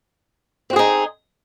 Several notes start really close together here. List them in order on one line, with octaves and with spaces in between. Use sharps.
C4 F#4 G#4 D#4